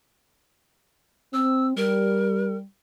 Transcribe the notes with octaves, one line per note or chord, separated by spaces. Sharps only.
C4 E6
G3 A#4